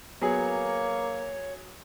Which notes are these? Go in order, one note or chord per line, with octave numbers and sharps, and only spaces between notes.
F#3 A#3 B3 G#4 C#5